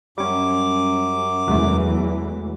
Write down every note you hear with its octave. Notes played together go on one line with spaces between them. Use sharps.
F#2 G3 C#4 D6
E2 E3 F#3 G#3 A3